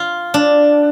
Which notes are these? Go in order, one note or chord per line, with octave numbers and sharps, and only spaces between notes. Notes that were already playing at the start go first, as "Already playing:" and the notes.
Already playing: F4
D4